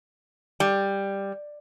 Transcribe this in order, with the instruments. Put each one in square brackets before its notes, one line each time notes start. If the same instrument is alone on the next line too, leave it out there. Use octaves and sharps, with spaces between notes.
[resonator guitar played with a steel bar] G3